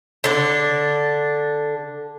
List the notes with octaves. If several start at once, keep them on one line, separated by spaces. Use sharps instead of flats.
D3 D4